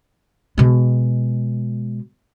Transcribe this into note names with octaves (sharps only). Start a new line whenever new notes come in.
B2 G#3